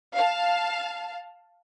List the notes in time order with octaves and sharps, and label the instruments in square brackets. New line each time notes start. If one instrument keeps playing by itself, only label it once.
[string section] F5 A5